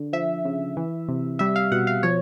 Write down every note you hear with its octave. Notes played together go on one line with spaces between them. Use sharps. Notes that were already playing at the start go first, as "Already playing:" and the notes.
Already playing: D3
F3 E5
C#3
E3
C3
G3 E5
F5
B2 F#5
F5
F3 C#5